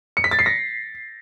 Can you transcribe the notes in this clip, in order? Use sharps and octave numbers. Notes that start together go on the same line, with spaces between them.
C#7
B6
A6
C7
A#6